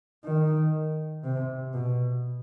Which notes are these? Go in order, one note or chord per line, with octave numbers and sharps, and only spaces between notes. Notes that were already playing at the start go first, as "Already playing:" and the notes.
D#3
C3
B2